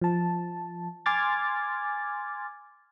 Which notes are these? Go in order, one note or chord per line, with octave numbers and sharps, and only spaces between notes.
F3 A5
G#5 C6 D6 F6 G#6 A6